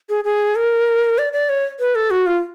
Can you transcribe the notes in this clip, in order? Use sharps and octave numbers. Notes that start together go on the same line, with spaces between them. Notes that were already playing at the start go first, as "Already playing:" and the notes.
G#4
G#4
A#4
D5
D5
C#5
B4
A4
F#4
F4